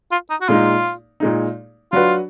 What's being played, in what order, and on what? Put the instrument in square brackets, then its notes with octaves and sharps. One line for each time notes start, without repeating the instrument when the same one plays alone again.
[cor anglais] F4
D#4
F#4
[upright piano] A#2 G#3 D#4 [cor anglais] F4
[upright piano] A#2 G#3 D#4
[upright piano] F#3 D4 F#4 B4 [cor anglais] F4